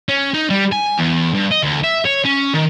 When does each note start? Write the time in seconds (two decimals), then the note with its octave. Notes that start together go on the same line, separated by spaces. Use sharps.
0.09 C#4
0.34 D#4
0.50 G3
0.73 G#5
0.99 E2
1.34 G2
1.51 D#5
1.63 D2
1.83 E5
2.05 C#5
2.25 C#4
2.54 D#3